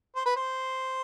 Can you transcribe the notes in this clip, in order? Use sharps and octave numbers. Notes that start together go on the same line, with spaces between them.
C5
B4
C5